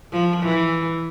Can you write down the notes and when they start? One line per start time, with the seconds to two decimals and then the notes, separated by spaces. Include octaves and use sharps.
0.12 F3
0.43 E3